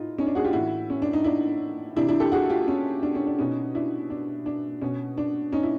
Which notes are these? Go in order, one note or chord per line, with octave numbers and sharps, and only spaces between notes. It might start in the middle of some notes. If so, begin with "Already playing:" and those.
Already playing: A2 D#4 F4
C#4 D#4
D4
F#4 G#4
F4 G4
A2 E3 E4 F#4
C#4
D4
D#4
D4 E4
C3 E3 D4 E4
D4 E4
G4 A4
F#4 G#4
F4 G4
C#4
D4
C#4
D4
B2 C#4 D#4
D4 E4
D4
D4
B2 C#4
D4
C#4 D#4
E4